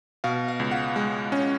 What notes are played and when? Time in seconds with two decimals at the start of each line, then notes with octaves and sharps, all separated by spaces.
0.24 B2 F5
0.48 F5
0.60 C#2
0.71 F#5
0.96 G#3
1.32 C#4